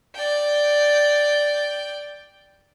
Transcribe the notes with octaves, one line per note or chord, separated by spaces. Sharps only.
D5 G5